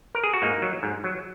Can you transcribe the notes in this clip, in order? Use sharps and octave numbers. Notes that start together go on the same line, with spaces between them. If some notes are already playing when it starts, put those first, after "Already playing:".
A#4
G#4
F#4
G#2 A#3 D#4
F#3
G#2
F#3